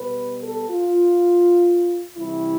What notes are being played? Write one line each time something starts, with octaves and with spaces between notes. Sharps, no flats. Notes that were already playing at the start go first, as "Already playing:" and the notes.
Already playing: B2 G3 B3 B4
A4
F4
C3 E3 G3 E4